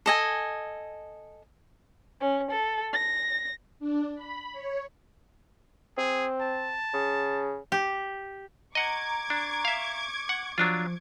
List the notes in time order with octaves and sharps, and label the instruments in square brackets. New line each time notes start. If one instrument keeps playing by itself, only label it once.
[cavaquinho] A4 D#5 G#5
[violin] C#4
A4
A#6
[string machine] D4
B5
C#5
[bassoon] C4 [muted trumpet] G#4
[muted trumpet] A5
[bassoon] C#3
[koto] G4
[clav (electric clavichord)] D#5 F#5 [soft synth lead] A#5 [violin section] C#6 D6 G#6
[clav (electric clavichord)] D4
E5 F5
F#5
[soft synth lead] F3 [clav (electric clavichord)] F#3 D4 F4